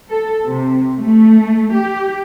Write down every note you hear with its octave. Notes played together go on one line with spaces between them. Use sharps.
A4
C3
A3
G4